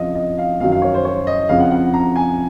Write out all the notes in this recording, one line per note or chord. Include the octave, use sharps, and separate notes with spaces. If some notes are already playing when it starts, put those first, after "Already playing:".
Already playing: F2 C#3 F3 D#5 F5
D#5
F5
F#2 D#3 F#3 F5
F5
C#5
C5
C#5
D#5
F2 C#3 F3 F5
F#5
F#5
A#5
G#5